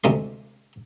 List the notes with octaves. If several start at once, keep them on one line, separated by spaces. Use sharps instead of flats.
D2 C3 G#3 D5 C6